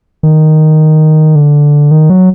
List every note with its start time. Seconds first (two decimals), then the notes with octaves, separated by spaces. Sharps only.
0.23 D#3
1.35 D3
1.91 D#3
2.10 F#3